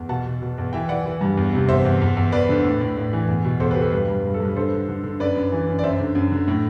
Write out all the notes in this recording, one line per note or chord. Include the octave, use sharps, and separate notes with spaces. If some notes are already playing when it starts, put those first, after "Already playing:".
Already playing: E2
B2 F#5 A5
B2
B2
E2
E3 E5 G5
E3 D5 F#5
E3
G2
E2
C3
E2 C5 E5
E2
E2
E2
E2 B4 D5
D3
A2
A2
A2
E3
E2
B2
E2 A4 C5
G4 B4
B2
F#4 A4
G2 G4 B4
G2
G2
A4
G2
B4
D3 A4 C5
D3
D3
D3
F#2 B4 D5
F#2
E3
F#2
D5
F#2 C5 E5
D3
F#2
D3
A2